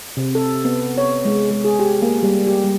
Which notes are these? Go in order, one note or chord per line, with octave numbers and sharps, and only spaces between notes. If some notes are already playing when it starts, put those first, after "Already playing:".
C3
A4
B3
C#5
G#3
G#3
G#4
G4
A#3
G3
G4
G3